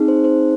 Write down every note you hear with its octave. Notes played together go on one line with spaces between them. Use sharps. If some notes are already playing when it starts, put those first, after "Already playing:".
Already playing: C4 D#4 G#4
C5
C5